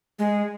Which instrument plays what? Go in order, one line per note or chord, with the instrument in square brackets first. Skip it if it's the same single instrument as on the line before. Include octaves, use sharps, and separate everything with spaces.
[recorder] G#3